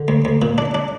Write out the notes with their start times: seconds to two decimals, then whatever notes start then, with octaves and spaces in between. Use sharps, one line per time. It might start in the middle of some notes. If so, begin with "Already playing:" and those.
Already playing: D3
0.08 D2
0.25 D2
0.42 A#2
0.58 D4
0.75 D4